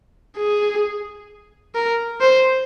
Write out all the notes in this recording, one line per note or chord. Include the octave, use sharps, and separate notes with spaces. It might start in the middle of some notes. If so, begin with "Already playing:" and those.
G#4
A#4
C5